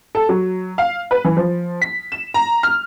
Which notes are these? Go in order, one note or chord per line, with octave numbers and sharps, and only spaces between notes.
A4
F#3
F5
B4
E3
F3
B6
E7
A#5
F6